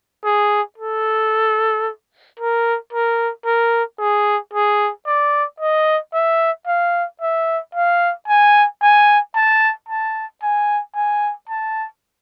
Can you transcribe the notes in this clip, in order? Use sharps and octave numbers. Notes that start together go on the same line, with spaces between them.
G#4
A4
A#4
A#4
A#4
G#4
G#4
D5
D#5
E5
F5
E5
F5
G#5
G#5
A5
A5
G#5
G#5
A5